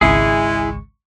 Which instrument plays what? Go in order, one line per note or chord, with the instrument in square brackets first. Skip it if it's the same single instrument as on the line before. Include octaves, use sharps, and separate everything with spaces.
[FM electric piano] G#1 C#2 C#6 [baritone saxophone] G#3 [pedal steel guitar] E4 G#4